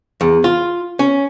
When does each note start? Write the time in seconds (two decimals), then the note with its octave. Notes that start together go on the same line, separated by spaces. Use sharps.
0.21 E2
0.44 F4
0.99 C#4